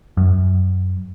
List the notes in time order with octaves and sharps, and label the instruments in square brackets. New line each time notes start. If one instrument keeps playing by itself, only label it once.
[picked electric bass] F#2